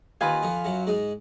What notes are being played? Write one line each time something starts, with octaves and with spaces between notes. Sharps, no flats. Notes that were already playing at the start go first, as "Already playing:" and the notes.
D#2 D#3 F4 B4 F5 G#5
F2 F3
F#2 F#3
G#2 G#3